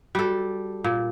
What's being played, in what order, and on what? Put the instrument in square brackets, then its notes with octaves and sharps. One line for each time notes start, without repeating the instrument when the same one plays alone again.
[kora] G3 A4 [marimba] F#4
[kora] A#2